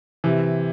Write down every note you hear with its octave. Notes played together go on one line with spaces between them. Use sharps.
C3 E3